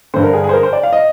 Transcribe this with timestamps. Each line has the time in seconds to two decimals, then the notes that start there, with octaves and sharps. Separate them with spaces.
0.14 G2 D3 C5
0.24 A#4
0.33 G#4
0.44 G#4
0.49 C5
0.53 A#4
0.63 C5
0.73 D5
0.83 F5
0.93 D#5